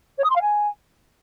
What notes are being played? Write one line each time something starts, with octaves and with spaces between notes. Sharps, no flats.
C#5
D#6
C6
F5
G#5